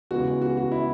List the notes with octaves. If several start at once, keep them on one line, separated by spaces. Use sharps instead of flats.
C#3 E3 G#3 B3 F#4
F#4
F#4
E4